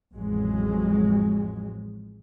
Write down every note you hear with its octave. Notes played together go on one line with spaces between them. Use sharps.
A1 F2 F#3 G#3